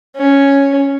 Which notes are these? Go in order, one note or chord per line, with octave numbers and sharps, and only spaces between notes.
C#4